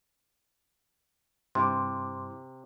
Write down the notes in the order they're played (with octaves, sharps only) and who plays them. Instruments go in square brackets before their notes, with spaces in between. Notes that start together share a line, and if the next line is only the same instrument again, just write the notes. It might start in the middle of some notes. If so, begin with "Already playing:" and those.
[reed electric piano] G2 E4 D6 [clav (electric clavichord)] C3 [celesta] C6